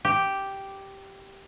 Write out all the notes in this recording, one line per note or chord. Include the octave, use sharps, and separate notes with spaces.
G4